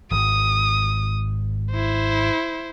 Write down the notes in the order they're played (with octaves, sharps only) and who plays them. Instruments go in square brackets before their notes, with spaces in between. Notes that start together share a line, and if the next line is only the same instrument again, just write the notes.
[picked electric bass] G#1 [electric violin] D#6
[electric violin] E4 C5